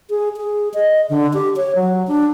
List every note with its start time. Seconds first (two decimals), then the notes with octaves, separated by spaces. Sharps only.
0.10 G#4
0.37 G#4
0.74 D#5
1.10 D3
1.34 G4
1.56 C#5
1.75 F#3
2.08 D4